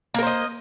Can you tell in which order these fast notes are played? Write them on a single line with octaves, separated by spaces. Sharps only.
A#3 A#4 C5 D#5